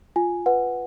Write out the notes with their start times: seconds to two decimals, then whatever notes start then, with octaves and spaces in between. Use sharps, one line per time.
0.16 F4 G#5
0.46 B4 F#5